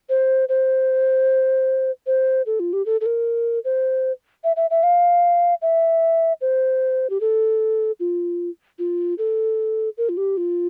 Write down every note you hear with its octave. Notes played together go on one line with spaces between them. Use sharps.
C5
C5
C5
A4
F4
G4
A4
A4
A#4
C5
E5
E5
E5
F5
E5
C5
G4
A4
F4
F4
A4
A#4
F4
G4
F4